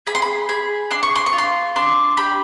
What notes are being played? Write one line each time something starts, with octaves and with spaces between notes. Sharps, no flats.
G#4 B5
C6
B5
G#4 B5
D4 C6
C#6
C6
C#6
F4
C6
D4 C6
G4 B5